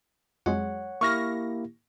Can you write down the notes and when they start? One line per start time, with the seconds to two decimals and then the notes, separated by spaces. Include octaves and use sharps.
0.46 F2 F#3 G#3 C#5 F#5
1.01 A#3 E4 G4 C#6 F6 A#6